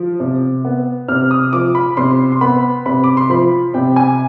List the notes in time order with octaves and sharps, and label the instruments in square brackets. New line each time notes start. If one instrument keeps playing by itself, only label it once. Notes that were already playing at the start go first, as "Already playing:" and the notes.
Already playing: [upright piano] F3
C3
B3
C3 F6
D#6
F3 D6
B5
C3 C6
C6
B3 B5
C3 B5
D6
C6
F3 B5
C3 G5
G#5